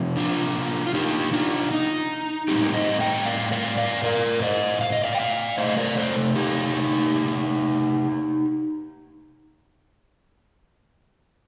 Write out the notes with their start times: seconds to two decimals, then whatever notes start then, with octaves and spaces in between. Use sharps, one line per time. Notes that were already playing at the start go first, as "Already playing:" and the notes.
Already playing: C3 F3 C4
0.17 D4 F4
0.87 F4
0.94 D#4 G4
1.33 D4 F4
1.71 D#4
2.48 A2 G3 C4 D#4 G4
2.74 C5 D#5
3.00 D#5 G5
3.26 D5 F5
3.52 D5 F5
3.78 D5 F5
4.04 A#4 D5
4.42 C5 D#5
4.81 F5
4.92 D#5
5.04 D5 F5
5.15 G5
5.20 D5 F5
5.58 C3 D#3 A3 C5 D#5
5.77 A#4 D5
5.97 A4 C5
6.36 D#4 G4